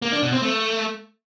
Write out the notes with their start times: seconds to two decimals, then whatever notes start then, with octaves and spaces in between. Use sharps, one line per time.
0.02 A#3
0.12 D4
0.22 B2
0.32 C4
0.43 A3